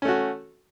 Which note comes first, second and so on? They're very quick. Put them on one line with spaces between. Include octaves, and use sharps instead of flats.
C#4 A3 F#4